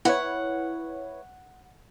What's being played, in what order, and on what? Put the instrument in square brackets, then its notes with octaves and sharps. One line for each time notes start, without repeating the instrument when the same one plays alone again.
[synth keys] E4 B4 C#5 [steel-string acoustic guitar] F#5